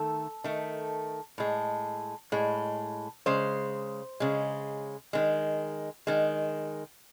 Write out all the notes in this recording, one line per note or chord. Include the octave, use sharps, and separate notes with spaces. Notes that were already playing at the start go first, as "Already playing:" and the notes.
Already playing: D#3 A3 A4
D#3 A3
A2 G#3
A2 G#3
C#3 G#3 C5
C#3 G#3
D#3 G#3
D#3 G#3